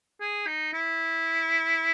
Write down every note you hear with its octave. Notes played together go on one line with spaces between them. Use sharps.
G#4
D#4
E4